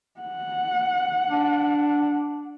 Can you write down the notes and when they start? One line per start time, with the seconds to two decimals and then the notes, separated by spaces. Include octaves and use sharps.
0.21 F#5
1.30 D4